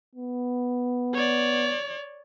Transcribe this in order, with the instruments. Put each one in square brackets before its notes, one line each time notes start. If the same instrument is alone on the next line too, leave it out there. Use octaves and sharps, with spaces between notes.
[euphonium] B3
[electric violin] C#5 D5